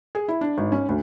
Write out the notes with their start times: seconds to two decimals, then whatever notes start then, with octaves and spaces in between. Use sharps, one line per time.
0.15 G#4
0.28 E4
0.41 D4
0.58 G#1
0.72 C#4
0.89 D2